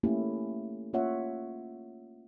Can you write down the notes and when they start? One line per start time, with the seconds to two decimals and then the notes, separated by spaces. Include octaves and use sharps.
0.03 A3 A#3 C#4 E4 G4
0.93 A#3 C#4 F4 C#5 E5 F#5